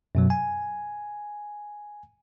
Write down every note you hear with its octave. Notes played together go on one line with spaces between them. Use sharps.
F#2 B2 F#3
G#5